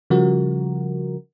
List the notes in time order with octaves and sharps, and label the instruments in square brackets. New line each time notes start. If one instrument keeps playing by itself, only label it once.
[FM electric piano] C#3 F3 G3 F#4 A#4